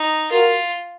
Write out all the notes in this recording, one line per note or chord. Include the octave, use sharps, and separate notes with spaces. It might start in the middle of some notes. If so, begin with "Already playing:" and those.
Already playing: D#4
F4 F#4 A#4